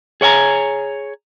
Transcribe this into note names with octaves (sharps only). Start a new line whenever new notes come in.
G#4 C#5 G5 G#5 A#5